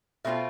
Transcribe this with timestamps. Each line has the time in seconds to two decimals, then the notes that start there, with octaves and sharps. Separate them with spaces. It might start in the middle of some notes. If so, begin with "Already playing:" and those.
0.25 B2 A3 C4 F4 E5